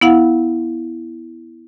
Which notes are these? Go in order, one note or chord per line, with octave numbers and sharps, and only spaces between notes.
B3 E4 F5 F#5